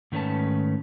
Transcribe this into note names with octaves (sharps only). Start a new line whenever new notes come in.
G#2 D#3 A3 C#4 B4 A5